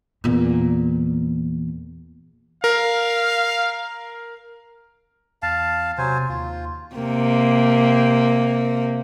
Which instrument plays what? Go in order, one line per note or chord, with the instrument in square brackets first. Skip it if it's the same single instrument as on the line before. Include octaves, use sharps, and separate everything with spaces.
[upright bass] E2 A#2
[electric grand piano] A#4 [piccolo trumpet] F5
[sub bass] E2 [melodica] F5 A5
[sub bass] C3 [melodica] F#3 C5 G#5
[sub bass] D#2 [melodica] F4
[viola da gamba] C3 A#3